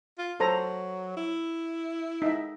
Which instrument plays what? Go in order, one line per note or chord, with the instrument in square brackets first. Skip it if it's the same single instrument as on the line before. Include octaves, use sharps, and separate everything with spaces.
[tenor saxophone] F4
[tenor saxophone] F#3 [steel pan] A4 C5 A#5
[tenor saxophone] E4
[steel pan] D#4 E5